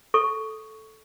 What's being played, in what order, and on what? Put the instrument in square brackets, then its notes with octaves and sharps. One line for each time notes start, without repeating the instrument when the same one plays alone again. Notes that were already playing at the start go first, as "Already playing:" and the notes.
[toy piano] A4 C#6